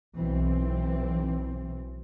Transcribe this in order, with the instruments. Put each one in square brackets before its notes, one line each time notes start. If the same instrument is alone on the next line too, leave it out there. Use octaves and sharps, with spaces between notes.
[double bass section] B1 E3 C4